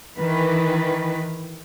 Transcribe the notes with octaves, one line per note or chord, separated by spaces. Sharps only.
D#3 E3 B4